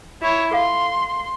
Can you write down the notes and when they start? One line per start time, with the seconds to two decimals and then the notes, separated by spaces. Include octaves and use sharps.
0.22 E4 C#5
0.51 A4 F5 C6